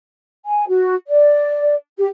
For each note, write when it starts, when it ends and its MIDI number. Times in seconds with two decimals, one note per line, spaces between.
0.46 0.64 80
0.69 0.94 66
1.08 1.74 74
1.98 2.06 67